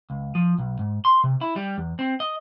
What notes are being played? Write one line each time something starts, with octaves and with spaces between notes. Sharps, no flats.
C#2
F3
B1
G#2
C6
C3
E4
G3
E2
C4
D#5